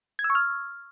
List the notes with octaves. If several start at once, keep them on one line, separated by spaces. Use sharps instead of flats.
G#6
E6
C#6
F6